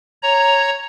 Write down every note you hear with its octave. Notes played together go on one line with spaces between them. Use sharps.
C#5 A#5